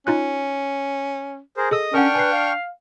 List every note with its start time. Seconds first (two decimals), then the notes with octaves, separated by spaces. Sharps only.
0.07 C#4 D#4 F4 F#6
1.57 G#4 A#4 C5
1.71 G#4 A4 D#5 D#6 E6
1.94 C#4 D4 A#4 F#5 G5 C#6 F6
2.15 B4 G#5 C7
2.32 F5